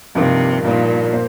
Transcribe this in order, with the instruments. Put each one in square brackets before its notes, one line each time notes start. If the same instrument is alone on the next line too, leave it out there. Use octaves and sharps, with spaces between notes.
[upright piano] G2 F3 A#3 D#4 [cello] C3
[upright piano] G2 F3 A#3 D#4 [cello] A#2
[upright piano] A#2 A#3 C5